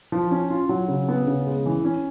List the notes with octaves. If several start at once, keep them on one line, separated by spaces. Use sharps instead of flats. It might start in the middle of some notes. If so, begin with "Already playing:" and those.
F3
C#4
F4
F#3
C#3
B3
C#3
G#3
E3
C#4